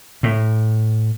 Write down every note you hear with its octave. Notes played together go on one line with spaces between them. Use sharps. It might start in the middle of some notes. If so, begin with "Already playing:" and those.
A2